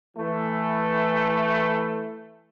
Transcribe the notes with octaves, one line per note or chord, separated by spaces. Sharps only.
E3 A3